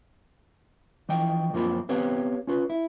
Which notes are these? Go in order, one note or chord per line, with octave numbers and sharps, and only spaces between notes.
E3 F3 D#5 G5
F#2 F3 A#3 C4 F4 B5
B3 C4 G4 B4 C#5 F5
C#4 F4 B4
E4